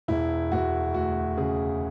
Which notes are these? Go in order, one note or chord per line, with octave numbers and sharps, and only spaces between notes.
E1 E4
E1 F#4
D2 F#4
C#3 G#4